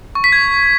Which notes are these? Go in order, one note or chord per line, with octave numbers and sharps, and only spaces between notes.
C#6
B6
G#6